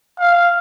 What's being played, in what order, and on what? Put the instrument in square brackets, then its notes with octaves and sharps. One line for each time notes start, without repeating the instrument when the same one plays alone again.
[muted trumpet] F5